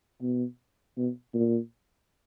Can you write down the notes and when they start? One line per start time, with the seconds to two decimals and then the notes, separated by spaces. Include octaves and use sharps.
0.21 B2
0.98 B2
1.34 A#2